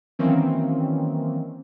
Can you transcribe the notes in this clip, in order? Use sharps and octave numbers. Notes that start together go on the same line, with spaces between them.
D#3 E3 F#3 A#3 C4 C#4